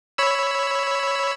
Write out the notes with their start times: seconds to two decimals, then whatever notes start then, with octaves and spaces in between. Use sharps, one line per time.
0.18 C#5 B5 E6